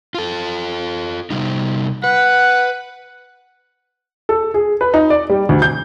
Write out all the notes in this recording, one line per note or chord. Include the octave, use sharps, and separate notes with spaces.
F4 A4
C3 G3 D#4
B4 F#5
A4
G#4
B4
D#4
D5
G3
D2
G6